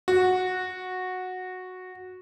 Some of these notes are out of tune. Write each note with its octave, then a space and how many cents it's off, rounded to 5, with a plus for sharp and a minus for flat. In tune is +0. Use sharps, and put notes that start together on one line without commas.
F#4 -10